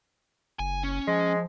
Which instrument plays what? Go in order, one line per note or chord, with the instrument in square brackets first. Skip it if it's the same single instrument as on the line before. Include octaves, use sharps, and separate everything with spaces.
[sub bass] F#1 [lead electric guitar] G#5
[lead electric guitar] C#4
[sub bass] F3 [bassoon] G#3